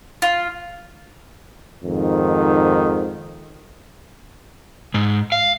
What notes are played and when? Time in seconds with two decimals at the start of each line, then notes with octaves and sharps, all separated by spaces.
0.22 F4
1.83 F2 G#2 D#3
4.94 G#2
5.32 F5